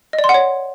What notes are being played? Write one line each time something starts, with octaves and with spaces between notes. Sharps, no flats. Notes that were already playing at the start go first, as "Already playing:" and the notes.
D#5
D5
C6
F#5
C#5